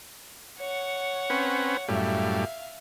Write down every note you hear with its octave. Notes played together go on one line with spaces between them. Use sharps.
C#5 F#5
C4 C#4 B4
F#2 A2 G3 E5 F5